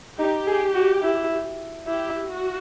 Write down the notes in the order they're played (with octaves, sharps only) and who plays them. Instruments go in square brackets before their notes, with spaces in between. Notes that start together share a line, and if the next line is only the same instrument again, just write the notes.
[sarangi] D#4 [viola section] G4
[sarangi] G#4
F#4
E4
[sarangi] E4 [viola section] G4
[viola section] F#4